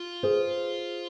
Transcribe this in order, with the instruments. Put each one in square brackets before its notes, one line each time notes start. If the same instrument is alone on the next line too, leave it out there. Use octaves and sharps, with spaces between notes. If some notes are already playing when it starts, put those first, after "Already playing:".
Already playing: [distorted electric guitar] F4
[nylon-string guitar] G#4 C5